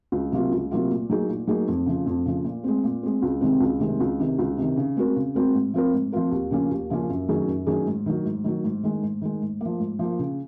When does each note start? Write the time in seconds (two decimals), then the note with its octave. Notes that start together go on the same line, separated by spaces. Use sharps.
0.12 C#2
0.32 C3 F#3 A#3 F4
0.52 C#2
0.71 C3 F#3 A#3 F4
0.90 A#2
1.10 F#3 A#3 D#4 G#4
1.29 A#2
1.47 F#3 A#3 D#4 G#4
1.68 F2
1.86 C#3 F3
2.06 F2
2.26 C#3 F3
2.44 A#2
2.64 G#3 C4
2.84 A#2
3.03 G#3 C4
3.22 C#2
3.41 C3 D#3 G#3 C4
3.60 C#2
3.80 C3 D#3 G#3 C4
4.00 C#2
4.19 C3 D#3
4.39 C#2
4.57 C3 D#3
4.77 C#3
4.96 G#3 C4 F#4 A#4
5.16 C#3
5.35 G#3 C4 F#4 A#4
5.54 G#2
5.74 F3 C4 F4 A#4
5.93 G#2
6.12 F3 C4 F4 A#4
6.32 D#2
6.51 C#3 F3 A#3 C#4
6.71 D#2
6.90 C#3 F3 A#3 C#4
7.10 F#2
7.29 D#3 F#3 C#4 G#4
7.48 F#2
7.67 D#3 F#3 C#4 G#4
7.87 G#2
8.06 D#3 F#3
8.25 G#2
8.44 D#3 F#3
8.64 G#2
8.83 D#3 G#3
9.02 G#2
9.22 D#3 G#3
9.42 G#2
9.61 F3 A#3
9.80 G#2
9.99 F3 A#3
10.19 C#3